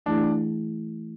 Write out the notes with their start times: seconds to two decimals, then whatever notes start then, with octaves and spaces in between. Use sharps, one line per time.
0.06 E3 A3 D4 E4 G#4